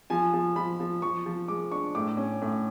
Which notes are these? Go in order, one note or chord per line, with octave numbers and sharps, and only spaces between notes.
F3 G#5
F3
F3 B5
F3
F3 C#6
F3
G#3 D6
D4 C#6
A2 D6
C#4
A2